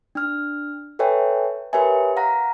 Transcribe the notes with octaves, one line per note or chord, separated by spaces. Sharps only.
D4 F6
A4 B4 C#5 E5 G5 G#5
G4 A#4 B4 C#5 E5 G#5
F5 F#5 A#5 A#6